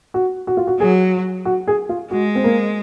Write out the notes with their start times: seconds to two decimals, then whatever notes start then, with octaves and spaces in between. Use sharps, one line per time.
0.14 F#4
0.47 F#4
0.57 F4
0.67 F#4
0.80 F#3 G#4
1.45 F#4
1.67 G#4
1.89 F4
2.11 G#3 F#4
2.35 C4
2.44 A#3